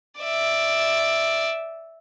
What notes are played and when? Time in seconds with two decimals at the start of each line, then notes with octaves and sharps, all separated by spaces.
0.20 D5 E5